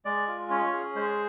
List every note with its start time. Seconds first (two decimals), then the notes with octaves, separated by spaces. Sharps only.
0.05 G#3 D5
0.28 F4
0.50 C#4 C#5
0.73 G#4
0.95 G#3 C5